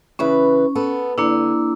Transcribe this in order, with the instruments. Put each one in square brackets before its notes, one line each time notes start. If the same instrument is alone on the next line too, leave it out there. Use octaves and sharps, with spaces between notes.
[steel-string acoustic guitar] C#3 E3 B4 [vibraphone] C#4
[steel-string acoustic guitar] B3 A4
[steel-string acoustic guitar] D3 [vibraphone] A#3 D4 E4